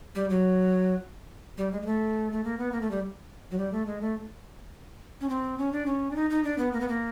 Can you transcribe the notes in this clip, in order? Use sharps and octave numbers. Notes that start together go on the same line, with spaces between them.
G3
F#3
G3
G#3
G#3
A3
A3
A#3
B3
A#3
A3
G3
F#3
G3
A3
G#3
A3
C#4
C4
C#4
D4
C#4
D4
D#4
D#4
D4
B3
A#3
B3
A#3